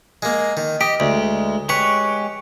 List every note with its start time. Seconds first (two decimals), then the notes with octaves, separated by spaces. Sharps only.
0.22 G#3 A#3
0.57 D#3
0.81 G4 D#5
1.00 D2 G#3
1.69 G#3 G4 B4 C#5